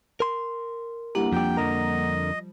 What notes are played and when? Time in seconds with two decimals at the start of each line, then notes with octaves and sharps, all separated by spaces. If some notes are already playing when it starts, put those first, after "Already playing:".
0.20 A#4 C6
1.15 G3 A#3 D4 E4 G4 F#5
1.33 F2 F3 G3 G4 G5
1.57 F2 D3 A#4 D#5